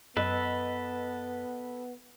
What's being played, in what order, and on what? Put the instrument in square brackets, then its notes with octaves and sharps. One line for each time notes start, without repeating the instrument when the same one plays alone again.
[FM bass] F#2 [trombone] B3 [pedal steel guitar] A4 B4 [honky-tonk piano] D#5